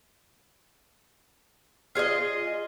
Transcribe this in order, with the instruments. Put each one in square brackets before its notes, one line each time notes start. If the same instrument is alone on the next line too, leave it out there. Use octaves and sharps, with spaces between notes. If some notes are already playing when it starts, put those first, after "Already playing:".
[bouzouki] F4 G#4 C#5 D#5